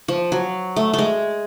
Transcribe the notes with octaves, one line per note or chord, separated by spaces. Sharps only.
F3
F#3
A3
G#3 A3